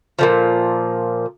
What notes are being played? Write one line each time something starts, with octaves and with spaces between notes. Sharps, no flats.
A#2 D3 F3